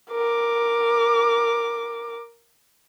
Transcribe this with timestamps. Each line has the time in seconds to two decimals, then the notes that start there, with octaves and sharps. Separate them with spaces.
0.11 A#4 D6